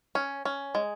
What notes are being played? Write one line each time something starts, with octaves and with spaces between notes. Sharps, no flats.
C#4
C#4
G#3